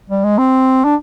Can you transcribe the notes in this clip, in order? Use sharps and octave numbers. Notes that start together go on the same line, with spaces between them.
G3
G#3
C4
D4